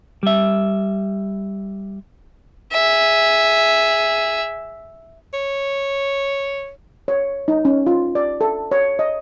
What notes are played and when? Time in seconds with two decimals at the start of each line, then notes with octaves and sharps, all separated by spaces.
0.23 G3 E5
2.73 G#4 E5
5.34 C#5
7.08 C#5
7.48 D#4
7.65 C#4
7.86 F4
8.15 D5
8.41 A4
8.72 C#5
8.99 D#5